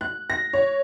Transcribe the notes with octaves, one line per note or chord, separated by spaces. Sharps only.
F#6
A#6
C#5